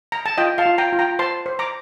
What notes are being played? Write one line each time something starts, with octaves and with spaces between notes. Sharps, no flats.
A#5
A5
F4 D#5 G5
F5 A5
F4
G5 A#5
F4
G5 A#5
C5 A5 C6
C5
A#5 D6